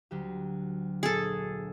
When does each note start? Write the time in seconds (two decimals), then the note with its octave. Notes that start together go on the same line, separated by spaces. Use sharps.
0.11 D2 F#3 G4
1.03 A#1 G#4 A4